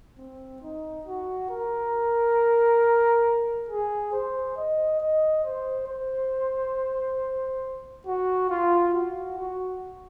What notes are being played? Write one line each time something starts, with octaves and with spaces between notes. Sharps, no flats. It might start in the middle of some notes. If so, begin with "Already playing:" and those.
C4
D#4
F#4
A#4
G#4
C5
D#5
D#5
C5
C5
F#4
F4
F#4
F#4